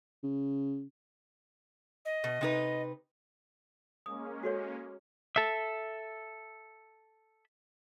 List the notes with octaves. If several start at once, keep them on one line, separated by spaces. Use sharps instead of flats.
C#3
D#5
B2
C3 D#4 B4
G#3 A#3 C#4 D#6
F#4 A4 C#5
A4 E5